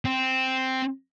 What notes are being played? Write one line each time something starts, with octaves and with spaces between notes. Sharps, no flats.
C4